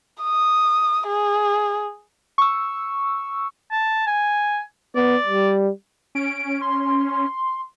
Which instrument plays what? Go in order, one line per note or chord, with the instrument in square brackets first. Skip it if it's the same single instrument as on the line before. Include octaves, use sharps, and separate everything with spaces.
[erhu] D#6
G#4
[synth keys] C#6 E6
[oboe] A5
G#5
[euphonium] B3 [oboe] D5
[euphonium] G3
[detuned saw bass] C#4 [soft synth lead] D7
[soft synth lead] C6